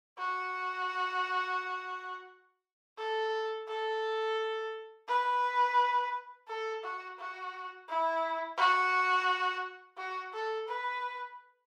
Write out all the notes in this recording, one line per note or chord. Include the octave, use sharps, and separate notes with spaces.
F#4
A4
A4
B4
A4
F#4
F#4
E4
F#4
F#4
A4
B4